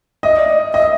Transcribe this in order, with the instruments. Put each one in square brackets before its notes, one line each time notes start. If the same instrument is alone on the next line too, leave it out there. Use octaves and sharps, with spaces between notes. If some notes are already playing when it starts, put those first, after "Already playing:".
[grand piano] D#5 [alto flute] E5
[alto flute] D5
D#5
[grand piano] D#5 [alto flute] E5